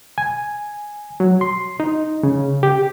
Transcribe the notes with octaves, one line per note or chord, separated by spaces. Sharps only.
G#5
F#3
C6
D#4
C#3
G4